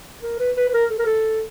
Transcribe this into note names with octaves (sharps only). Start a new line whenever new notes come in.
A#4
B4
B4
B4
A#4
A4
A#4
A4